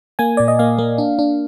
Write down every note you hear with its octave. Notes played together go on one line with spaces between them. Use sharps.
A#3 G#5
A#2 D5
D#5
A#3 F5
A#3
D4
D4